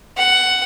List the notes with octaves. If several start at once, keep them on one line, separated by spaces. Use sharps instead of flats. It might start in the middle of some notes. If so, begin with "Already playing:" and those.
F#5